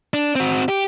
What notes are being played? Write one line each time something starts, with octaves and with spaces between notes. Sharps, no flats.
D4
C4 F#4
G4